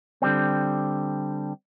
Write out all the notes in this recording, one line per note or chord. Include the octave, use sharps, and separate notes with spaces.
D3 G3 C4